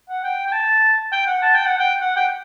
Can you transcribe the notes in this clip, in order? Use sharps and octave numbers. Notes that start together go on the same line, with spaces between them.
F#5
G5
G5
A5
G5
F#5
A5
G5
F#5
G5
F#5
G5